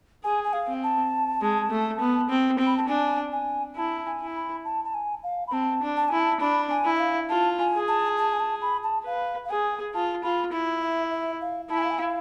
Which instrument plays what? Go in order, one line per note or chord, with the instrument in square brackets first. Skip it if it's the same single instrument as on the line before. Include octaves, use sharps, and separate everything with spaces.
[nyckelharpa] G#4 [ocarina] G#5
[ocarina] G#5
F5
[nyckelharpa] C4
[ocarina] A5
[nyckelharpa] G#3
A3
B3
C4
C4
[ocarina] B5
A5
[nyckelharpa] D4 [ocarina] G#5
[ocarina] G#5
[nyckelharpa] E4 [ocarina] A5
[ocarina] G#5
[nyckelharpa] E4
[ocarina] B5
A5
A5
G#5
F5
B5
[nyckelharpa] C4 [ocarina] A5
[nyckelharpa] D4
[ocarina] A5
[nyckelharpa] E4 [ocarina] G#5
[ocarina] A5
[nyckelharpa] D4 [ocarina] B5
[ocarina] G#5
[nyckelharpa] E4
[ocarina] E5
F5
[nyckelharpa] F4 [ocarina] A5
[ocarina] G#5
[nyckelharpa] G#4
[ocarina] A5
A5
G#5
A5
B5
A5
[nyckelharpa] B4 [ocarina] F5
[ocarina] F5
[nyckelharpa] G#4 [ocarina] G#5
[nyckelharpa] F4 [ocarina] A5
[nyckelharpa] F4 [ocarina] B5
[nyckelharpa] E4
[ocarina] E5
E5
F5
[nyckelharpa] E4 [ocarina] A5
[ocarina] G#5
F5
G#5
F5